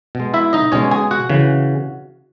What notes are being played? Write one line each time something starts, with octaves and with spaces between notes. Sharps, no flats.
B2 G#3
E4 E5
D#4 D#5
B2 G#3 C#4 C#5
G#4 G#5
F#4 F#5
C#3 E3